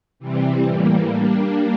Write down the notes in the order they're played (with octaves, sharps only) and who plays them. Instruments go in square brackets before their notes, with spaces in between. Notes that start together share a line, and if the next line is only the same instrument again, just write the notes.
[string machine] C3 E3 G3 C4
A2 E3 G3 A#3
G3 A#3 D4